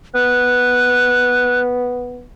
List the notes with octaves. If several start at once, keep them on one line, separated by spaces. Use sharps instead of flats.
B3 F#6